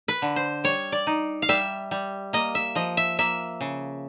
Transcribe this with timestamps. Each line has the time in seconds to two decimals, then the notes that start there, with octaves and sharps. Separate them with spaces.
0.08 B4
0.22 D3
0.36 C5
0.64 G3 C#5
0.92 D5
1.07 D#4
1.42 F5
1.49 G3 E5
1.91 G3
2.33 A#3 D#5
2.55 E5
2.75 F3 D#5
2.97 E5
3.19 A#3 E5
3.61 C#3